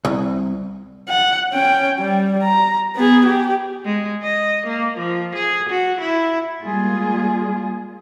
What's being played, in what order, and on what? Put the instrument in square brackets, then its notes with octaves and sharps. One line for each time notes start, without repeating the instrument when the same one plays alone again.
[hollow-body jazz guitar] C2
[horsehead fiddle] F#5
C#4 G5
G3
A#5
B3 G#4
G4
[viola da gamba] G#3
D#5
A#3
F3
G#4
F#4
E4
[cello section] G3 G#3 A#3 F4 G#4